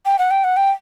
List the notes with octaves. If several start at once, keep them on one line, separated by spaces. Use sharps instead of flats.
G5
F#5
G5
F#5
G5